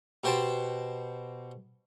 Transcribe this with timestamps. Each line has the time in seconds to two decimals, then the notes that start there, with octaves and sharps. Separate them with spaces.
0.24 B2 G4 C5 G5 A5